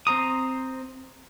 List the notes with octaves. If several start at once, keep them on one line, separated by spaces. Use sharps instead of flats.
C4 C5 A#5 D#6